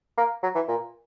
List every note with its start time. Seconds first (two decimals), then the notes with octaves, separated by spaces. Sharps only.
0.18 A#3
0.43 F#3
0.55 E3
0.68 A#2